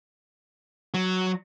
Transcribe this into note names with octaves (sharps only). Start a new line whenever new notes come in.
F#3